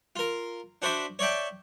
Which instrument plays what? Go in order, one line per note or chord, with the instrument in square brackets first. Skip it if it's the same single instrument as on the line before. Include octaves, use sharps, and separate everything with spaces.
[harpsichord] F4 A#4
D4 F#4 C5 D5 E5 B5
C#5 D5 E5 G5 A5